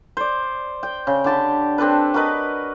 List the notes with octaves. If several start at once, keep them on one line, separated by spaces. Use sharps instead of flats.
C5 D5
G5
C#3
D3 G4 A5 B5
C4 D4 A4 B4
F#4 A#4 B4 D#5